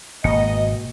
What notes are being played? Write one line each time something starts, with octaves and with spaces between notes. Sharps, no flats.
G#1 B2 A#3 D#5